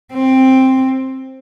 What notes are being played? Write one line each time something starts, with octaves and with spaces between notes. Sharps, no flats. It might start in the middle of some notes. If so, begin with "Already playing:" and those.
C4